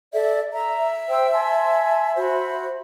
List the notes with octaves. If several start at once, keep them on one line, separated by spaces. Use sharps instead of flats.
A4 D5 E5
E5 A#5
C5 G5 E6
G#5 A5 C6
F#4 C5 B5